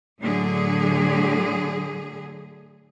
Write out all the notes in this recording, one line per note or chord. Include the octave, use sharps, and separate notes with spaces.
A2 D3 F#3 G#4